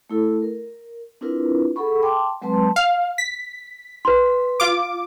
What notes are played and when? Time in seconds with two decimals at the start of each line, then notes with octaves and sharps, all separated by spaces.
0.10 A3 E4 A4
0.42 A#4
1.21 C4 D4 E4 F4 A#4 B4
1.76 G#4 A4 F#5 B5 C#6
2.03 G5 A5 C6 D6
2.42 F#3 G#3 C4 B4 A5 C6
2.76 F5
3.18 B6
4.05 B4 C6
4.60 F4 D6